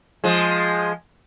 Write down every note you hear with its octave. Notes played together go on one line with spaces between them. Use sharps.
F3 G#3